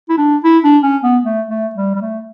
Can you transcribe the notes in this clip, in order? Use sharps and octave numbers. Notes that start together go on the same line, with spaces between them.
E4
D4
E4
D4
C#4
B3
A3
A3
G3
G3
A3